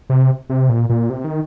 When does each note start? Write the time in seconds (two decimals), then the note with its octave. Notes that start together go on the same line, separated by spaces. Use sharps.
0.10 C3
0.50 C3
0.69 A#2
0.90 A#2
1.10 C3
1.24 D#3